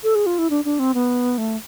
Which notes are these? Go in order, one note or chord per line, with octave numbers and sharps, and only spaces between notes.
A4
G#4
F4
E4
D4
D4
C4
B3
A3